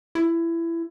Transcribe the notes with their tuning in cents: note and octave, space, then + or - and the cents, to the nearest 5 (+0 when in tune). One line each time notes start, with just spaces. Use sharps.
E4 +20